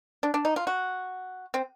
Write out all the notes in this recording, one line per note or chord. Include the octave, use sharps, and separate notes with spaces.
D4
D4
D#4
F4
F#4
C4